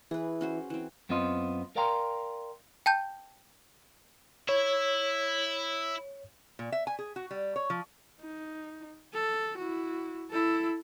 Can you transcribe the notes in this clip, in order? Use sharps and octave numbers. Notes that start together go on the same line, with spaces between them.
E3 G#4 B4
C#4 F#4 C5
E3 C4
F#2 B3 C4 F4 D#5 C6
A#4 D5 F5 G5 A#5 C6
G5 A5 G6
E4 C#5
A#2
E5
G#5
G#4
F#4
G3
C#5
F3
D#4
A4
E4 F#4
E4 A4